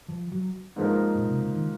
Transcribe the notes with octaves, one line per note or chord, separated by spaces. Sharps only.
F3
F#3
G#2 F3 A#3 D#4 A#4
A#2
C3
C#3
D#3